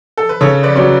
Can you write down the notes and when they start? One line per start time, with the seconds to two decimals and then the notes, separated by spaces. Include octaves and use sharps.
0.17 A4
0.29 B4
0.41 C#3 A4 C#5
0.63 B4 D5
0.75 F#3 C#4 D5